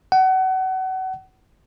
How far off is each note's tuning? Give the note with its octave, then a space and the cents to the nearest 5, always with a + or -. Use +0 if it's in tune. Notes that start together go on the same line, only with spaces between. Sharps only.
F#5 +30